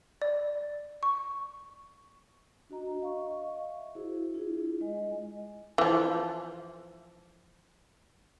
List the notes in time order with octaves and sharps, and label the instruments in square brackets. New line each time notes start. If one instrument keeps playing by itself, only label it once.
[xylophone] D5
C#6
[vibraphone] D4 F#4 D#5 A#5
D#5 F5 C#6
E5
E4 F#4 G#4 C5
D4 E4 F4 G#4
G#3 D#5 G#5
[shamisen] E3 F3